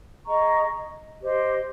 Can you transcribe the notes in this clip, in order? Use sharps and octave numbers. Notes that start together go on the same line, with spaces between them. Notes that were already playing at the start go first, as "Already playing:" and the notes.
G#4 D#5 A#5 C#6
G4 C5 D#5